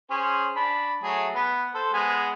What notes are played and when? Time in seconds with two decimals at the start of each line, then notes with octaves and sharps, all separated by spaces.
0.10 C#4 G#4 C5
0.56 D4 B5
1.03 F#3 A3 G#4
1.35 B3 B4
1.74 A4 C5
1.93 G#3 B3 G#5